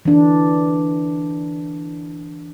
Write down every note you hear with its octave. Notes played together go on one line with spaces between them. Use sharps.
E3 D4